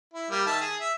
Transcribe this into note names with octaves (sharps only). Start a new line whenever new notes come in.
E4
G3 A#3
D#3 E5 A5
G#4
E5